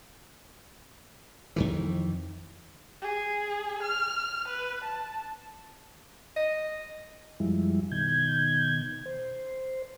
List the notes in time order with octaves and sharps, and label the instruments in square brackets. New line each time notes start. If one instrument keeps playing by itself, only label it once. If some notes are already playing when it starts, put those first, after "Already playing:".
[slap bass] F2 D#3 E3
[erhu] G#4
F6
B4
A5
[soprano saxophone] D#5
[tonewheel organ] F#2 F3 G3 G#3 E4
B2 D#3 G6 G#6
C5